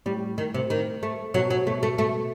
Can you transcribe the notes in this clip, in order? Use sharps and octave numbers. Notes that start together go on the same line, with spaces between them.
A2 G3
D#3
C3
D#3
A3
B2 F#3
F#3
B2 A3
A3
A3